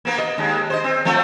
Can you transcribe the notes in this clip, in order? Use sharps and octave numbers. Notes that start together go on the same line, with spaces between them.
A#3 B3 A#4
D#5
D#2 G#3
C5 D#5
C4
F3 A3 C4